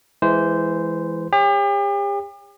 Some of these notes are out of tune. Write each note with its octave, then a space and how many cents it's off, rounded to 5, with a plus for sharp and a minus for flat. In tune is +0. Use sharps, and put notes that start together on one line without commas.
E3 +0 G#3 -5 C5 -15
G4 +40 C#5 -15